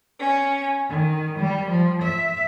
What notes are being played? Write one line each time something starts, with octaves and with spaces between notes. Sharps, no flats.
C#4
D#3
G3
F3
E5